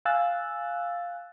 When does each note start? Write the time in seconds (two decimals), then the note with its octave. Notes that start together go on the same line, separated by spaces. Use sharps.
0.05 F5 G#5 E6 F#6 A6